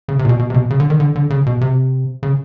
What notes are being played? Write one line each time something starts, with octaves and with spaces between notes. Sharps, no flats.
C#3
C3
A#2
B2
B2
C3
B2
C#3
D3
D#3
D3
D3
C#3
B2
C3
C#3